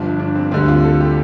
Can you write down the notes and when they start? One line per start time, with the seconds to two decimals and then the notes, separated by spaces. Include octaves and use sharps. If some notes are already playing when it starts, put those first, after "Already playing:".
Already playing: G1 G2 F3
0.19 D4
0.35 C4
0.51 D2 D3 G3 C4
0.68 F4
0.84 A4
1.00 G4